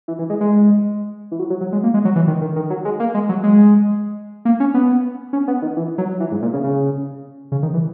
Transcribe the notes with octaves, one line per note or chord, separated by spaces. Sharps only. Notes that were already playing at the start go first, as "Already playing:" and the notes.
E3
E3
G#3
G#3
E3
F#3
F#3
F#3
G#3
A#3
G#3
F#3
E3
D#3
D#3
D#3
F#3
G#3
A#3
G#3
F#3
G#3
A#3
C#4
B3
C#4
B3
D#3
E3
F#3
E3
G#2
A#2
C#3
C#3
C#3
D#3
E3